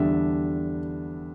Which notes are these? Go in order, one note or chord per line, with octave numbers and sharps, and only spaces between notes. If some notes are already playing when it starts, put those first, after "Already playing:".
Already playing: E2 D3 G3 D4 E5